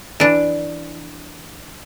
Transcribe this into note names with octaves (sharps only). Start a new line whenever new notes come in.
E3 D4